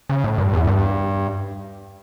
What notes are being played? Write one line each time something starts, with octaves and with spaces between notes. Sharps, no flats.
C#3
A2
G2
E2
G2